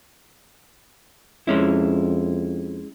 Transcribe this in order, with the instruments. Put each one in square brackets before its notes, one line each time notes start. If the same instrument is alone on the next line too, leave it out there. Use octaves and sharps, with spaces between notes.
[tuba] F2 [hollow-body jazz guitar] G#3 C#4 E4